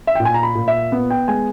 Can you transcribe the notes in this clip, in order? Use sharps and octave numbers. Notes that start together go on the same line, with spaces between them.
E5
G5
A#2
G#5
A#5
B5
A#2
E5
B3
G5
G#3 G#5